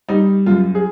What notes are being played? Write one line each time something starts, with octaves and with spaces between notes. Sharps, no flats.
G3 D#4
F#2 F4
G#4